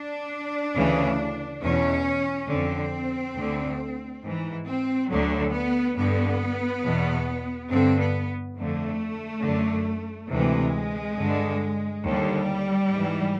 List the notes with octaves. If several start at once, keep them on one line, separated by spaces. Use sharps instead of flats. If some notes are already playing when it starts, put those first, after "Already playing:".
Already playing: D4
D2 C#3 E3
E2 B2 C#4
F2 D3 C4
D2 D3
G#2 E3
C4
D2 D3 F#3
B3
G2 D3 B3
E2 B2
G2 D3 C4
B3
F2 D3 A3
F#2 D3
D2 C3 E3 G#3
G2 D3
D#2 D3 G3
G#2 E3